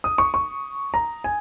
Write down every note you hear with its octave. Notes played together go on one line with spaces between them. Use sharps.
D#6
C#6
C#6
A#5
G#5